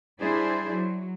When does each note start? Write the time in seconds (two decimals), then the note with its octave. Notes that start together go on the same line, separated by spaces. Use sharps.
0.18 G3 D4 E4 G#4 C5 D5
0.71 F#3